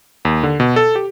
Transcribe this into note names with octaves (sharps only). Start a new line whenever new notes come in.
D#2
D3
B2
A4
G4